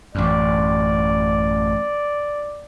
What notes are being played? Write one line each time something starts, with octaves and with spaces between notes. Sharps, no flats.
A1 F#2 D5